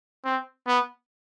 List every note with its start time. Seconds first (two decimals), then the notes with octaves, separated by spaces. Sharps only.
0.25 C4
0.67 B3